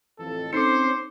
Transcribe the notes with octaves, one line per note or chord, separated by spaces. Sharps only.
A1 F2 A4
C4 C#4 D#4 A4 C5 D6 C7 C#7